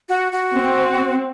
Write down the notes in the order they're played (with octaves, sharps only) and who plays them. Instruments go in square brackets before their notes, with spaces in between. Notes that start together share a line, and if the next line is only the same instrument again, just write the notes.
[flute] F#4
F#4
[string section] C4